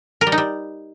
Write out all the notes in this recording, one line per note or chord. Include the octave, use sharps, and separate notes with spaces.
A#4
G3
D#4
G3